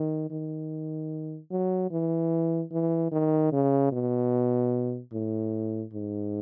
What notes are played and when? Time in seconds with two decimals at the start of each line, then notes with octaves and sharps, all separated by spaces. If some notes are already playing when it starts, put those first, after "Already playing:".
Already playing: D#3
0.31 D#3
1.51 F#3
1.91 E3
2.72 E3
3.12 D#3
3.52 C#3
3.92 B2
5.13 A2
5.93 G#2